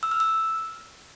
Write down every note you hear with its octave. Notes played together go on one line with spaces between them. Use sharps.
E6
F6
E6